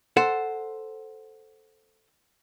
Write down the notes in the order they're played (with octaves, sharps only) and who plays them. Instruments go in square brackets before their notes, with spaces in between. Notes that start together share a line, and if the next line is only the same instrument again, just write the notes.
[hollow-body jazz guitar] A4 C5 F#5